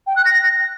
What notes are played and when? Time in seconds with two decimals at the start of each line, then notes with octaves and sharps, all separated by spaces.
0.07 G5
0.16 F#6
0.25 A#6